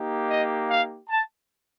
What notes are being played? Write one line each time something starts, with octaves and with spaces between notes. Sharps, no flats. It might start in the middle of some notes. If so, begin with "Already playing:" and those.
Already playing: A#3 D#4 G4
D#5
F5
A5